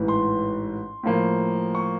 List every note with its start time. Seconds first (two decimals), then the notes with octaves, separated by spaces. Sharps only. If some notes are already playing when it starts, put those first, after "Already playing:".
Already playing: A1 G#2 E3
0.08 C6
1.03 A2 F3 A#3
1.75 C#6